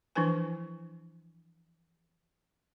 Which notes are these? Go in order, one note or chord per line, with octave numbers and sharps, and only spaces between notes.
E3 F3 D4 E4 B4 G#5